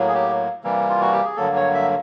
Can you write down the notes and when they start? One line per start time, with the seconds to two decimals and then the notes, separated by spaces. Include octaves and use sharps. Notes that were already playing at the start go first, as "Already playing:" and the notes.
Already playing: A2 F#3 A#3
0.08 G#4
0.15 G4
0.64 C3 E3 G3 A#3
0.89 F4
1.01 F#4
1.13 G4
1.25 G#4
1.36 G2 D3 F#3 A#3 A4
1.56 C#5
1.74 E5